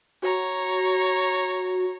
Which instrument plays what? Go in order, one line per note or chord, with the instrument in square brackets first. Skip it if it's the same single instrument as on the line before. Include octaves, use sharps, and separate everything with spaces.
[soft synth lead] F#4 [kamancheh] C#5 A#5